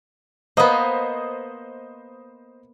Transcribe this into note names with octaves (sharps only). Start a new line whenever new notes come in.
A#3 B3 C5 D#5 D#6